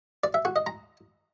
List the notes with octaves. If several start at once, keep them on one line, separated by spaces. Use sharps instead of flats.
D5
E5
F#4
D#5
A#5